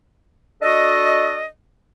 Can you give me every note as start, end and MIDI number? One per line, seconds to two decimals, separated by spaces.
0.62 1.44 62
0.62 1.44 66
0.62 1.44 69
0.62 1.44 75